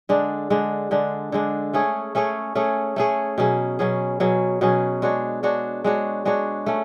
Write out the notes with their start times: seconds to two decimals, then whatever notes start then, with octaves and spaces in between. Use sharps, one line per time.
0.09 D3 G#3 D4
0.50 D3 G#3 D4
0.91 D3 G#3 D4
1.32 D3 G#3 D4
1.73 A3 C#4 G#4 C#5
2.15 A3 C#4 G#4 C#5
2.55 A3 C#4 G#4 C#5
2.96 A3 C#4 G#4 C#5
3.38 B2 F#3 C#4 G#4
3.79 B2 F#3 C#4 G#4
4.20 B2 F#3 C#4 G#4
4.61 B2 F#3 C#4 G#4
5.02 G#3 D4 F#4 C#5
5.43 G#3 D4 F#4 C#5
5.84 G#3 D4 F#4 C#5
6.25 G#3 D4 F#4 C#5
6.66 A3 C#4